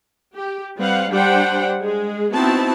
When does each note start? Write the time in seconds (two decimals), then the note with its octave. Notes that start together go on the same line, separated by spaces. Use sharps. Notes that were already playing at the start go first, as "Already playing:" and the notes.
0.35 G4
0.78 G3 C4 B4 F5 F#5
1.10 G3 D4 G4 C5 F#5 G5
1.81 G#3 G#4
2.33 B3 C4 D#4 E4 F#4 A5